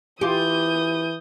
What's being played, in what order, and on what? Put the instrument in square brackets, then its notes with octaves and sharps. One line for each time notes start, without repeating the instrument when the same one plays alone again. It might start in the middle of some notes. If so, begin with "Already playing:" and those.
[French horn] E3 [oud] F4 G4 [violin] D#6 G6